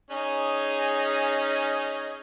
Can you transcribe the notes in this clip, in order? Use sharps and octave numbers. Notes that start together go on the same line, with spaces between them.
C#4 D#4 G#4